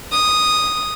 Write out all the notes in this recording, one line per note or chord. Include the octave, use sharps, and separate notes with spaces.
D#6